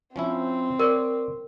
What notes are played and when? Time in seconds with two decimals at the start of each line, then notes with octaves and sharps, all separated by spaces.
0.16 F3 C4 C#4 E4
0.79 A#4 C#5 D5